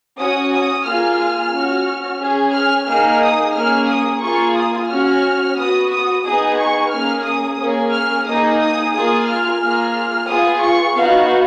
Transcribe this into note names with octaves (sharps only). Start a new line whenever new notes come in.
C#4 F#4 D#6
D#6
A#3 F4 G#4 F6
C#4 F#4
C#4 G#4
F6
A#3 D#4 G#4 F6
D#6
A#3 C#4 G#4 F6
D#6
A#3 F4 G#4 C#6
D#6
C#4 F#4 F6
B3 F#4 D#6
D#6
B3 D#4 G#4 D#6
C#6
A#3 C#4 G#4 F6
D#6
A#3 C#4 G#4
F6
A#3 D#4 G#4 D#6
D#6
A#3 F4 G#4 D#6
F6
A#3 F4 G#4
B3 F4 G#4 D#6
C#6
B3 D#4 F#4 F5